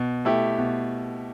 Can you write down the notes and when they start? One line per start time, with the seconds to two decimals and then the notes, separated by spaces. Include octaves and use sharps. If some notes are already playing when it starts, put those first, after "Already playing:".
Already playing: B2
0.25 A3 E4 G4
0.58 B2